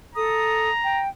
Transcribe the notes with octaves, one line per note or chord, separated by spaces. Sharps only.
A4 A#5 D#6
G5